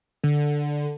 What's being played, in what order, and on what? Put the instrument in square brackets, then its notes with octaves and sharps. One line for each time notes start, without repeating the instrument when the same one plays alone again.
[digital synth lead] D3